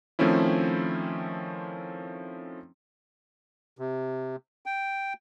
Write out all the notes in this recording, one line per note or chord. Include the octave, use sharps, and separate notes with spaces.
D#3 F3 A3 C4 C#4 E4
C3
G5